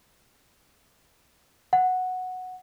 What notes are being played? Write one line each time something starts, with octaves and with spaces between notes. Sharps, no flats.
F#5